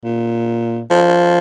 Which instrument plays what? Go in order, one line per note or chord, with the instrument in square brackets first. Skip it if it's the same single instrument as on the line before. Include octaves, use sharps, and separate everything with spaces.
[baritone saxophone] A#2
F3